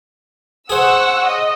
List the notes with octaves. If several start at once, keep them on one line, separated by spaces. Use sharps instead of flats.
G#4 C5 F#5 C#6 E6
D#5